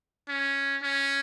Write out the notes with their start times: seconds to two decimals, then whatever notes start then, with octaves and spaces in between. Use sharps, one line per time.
0.29 C#4
0.82 C#4